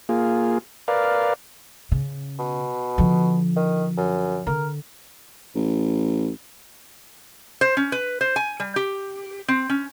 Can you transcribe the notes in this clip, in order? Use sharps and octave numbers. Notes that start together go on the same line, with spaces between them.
A#3 F4 G#4
A#4 B4 D5 F5
C#3
B2
D3 F3
D#3
F#2
D3 A#4
A1
C5
C#4
B4
C5
G#5
G3
G4
C4
C#4